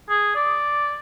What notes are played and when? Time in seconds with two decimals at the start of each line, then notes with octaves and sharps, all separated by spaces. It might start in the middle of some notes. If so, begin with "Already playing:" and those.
0.10 G#4
0.36 D5